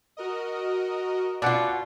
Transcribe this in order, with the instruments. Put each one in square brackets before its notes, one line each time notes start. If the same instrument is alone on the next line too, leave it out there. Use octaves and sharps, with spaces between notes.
[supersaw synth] F#4 A#4 D#5
[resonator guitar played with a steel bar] B2 F4 [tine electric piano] D5 F#5